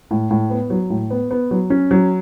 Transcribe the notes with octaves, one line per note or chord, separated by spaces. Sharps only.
A2
A2
B3
F#3
A2
B3
B3
F#3
C#4
F#3